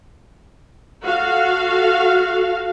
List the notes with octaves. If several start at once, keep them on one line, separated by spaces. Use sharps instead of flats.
F#4 A4 F5